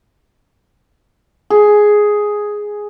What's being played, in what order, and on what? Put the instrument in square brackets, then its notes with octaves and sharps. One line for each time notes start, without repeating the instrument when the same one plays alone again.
[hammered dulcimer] G#4